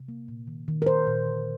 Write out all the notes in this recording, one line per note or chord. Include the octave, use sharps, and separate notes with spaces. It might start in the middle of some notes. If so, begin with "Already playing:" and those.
Already playing: C3
A#3
A#2
D#3
D#3
A#4
A#2 C5
A#2
D3